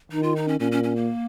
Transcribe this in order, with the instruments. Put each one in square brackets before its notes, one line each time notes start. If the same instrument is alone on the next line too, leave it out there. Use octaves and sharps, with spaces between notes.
[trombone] D#3 [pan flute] D#4
[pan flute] F4
D#4
C#4
[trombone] A#2 [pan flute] C#4
[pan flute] C#4
C#4
A#3